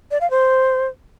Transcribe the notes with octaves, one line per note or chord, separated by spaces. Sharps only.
D5
F5
C5